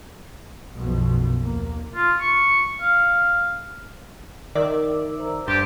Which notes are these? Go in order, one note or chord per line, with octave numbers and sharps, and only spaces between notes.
B1 F#2 B2 F3
D#2 A#3
F4
C#6
F5
D#3 A#4 D5 E5
C5 A#5 E6
G2 D4 G4 A4 C5 A6